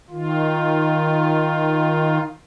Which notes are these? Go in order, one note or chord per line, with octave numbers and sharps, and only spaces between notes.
D#3 F4